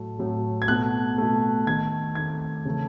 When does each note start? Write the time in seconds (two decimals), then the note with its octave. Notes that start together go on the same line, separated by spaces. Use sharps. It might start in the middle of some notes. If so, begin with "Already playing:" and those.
Already playing: A2 F#3 A3
0.19 A2 F#3 A3
0.62 G#6
0.68 B2 A3 F#6
1.18 B2 A3
1.67 D#3 A3 G#6
2.15 D#3 A3 G#6
2.65 C#3 E3 A3